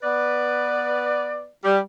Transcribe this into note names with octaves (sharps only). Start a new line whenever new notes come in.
B3 B4 D5
G3